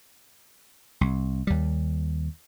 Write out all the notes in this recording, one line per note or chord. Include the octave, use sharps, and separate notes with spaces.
C2
D#2 G3